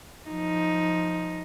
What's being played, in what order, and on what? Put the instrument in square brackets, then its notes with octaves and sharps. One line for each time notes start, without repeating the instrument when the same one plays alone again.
[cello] F3 D#4